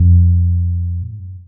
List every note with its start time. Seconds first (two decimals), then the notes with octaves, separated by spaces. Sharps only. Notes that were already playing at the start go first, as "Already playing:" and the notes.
Already playing: F2
1.02 A#2
1.12 G#2
1.20 F#2